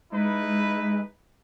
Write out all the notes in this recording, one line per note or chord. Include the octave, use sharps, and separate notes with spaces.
G#3 D#4 E4 B4